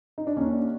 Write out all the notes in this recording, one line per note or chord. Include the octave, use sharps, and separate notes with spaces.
D#4
D4
D#2 C#4